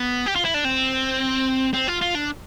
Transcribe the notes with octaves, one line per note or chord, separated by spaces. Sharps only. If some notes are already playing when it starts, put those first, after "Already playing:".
Already playing: B3
G4
F4
E4
D4
C4
C4
F4
F4
D4